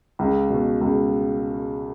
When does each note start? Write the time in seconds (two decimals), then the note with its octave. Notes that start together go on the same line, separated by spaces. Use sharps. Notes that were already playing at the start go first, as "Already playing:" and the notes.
0.19 C#2
0.50 B2
0.81 C#2